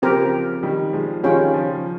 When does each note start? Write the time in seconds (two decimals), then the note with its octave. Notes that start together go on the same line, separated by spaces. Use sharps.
0.02 C#3 F3 C4 G4 A#4
0.63 D#3 G3
0.93 F3 G#3
1.23 D#3 G3 C#4 F4 G#4 C#5 G5
1.54 C#3 F3